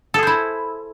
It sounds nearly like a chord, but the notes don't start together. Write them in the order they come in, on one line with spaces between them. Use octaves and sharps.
A4 G#4 C5 E4